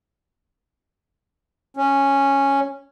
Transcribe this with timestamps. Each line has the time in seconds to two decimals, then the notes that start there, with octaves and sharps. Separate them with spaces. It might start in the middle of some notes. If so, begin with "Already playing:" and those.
1.77 C#4